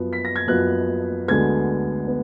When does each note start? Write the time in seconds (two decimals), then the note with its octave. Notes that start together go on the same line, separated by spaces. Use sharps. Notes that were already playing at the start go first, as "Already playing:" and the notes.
Already playing: F#2 F3 B3
0.13 B6
0.25 A#6
0.36 G#6
0.48 F#2 F3 B3 F#6
1.28 D2 D3 G#3 B3 G#6
2.08 B3